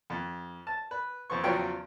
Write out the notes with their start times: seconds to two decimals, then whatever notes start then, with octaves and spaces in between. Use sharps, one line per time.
0.10 F2
0.67 A5
0.91 B4
1.30 F2 C4 C#6
1.43 E2 C#3 F3 F#3 G5 C#6